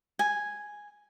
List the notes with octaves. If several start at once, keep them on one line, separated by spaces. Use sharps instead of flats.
G#5